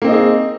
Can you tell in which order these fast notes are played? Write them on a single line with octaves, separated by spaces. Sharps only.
A#3 C4 D#4 D#5 G#4